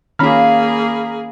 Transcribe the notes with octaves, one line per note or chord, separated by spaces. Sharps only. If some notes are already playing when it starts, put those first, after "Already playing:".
D#3 A#3 C#4 F4 G#4 F5 A#5 B5